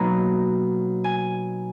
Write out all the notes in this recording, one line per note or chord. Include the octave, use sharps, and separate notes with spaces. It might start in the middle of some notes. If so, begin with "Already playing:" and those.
Already playing: B2 F#3 A#3 D#4 A#5
G#5